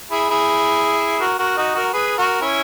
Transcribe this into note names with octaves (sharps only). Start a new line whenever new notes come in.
E4 G#4
E4 G#4
F#4 A#4
F#4 A#4
D#4 F#4
F#4 A#4
G#4 B4
F#4 A#4
C#4 E4